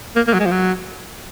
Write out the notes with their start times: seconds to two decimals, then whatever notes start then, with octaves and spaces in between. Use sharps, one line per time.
0.16 A#3
0.27 A#3
0.33 F#3
0.40 G#3
0.46 F3
0.51 F#3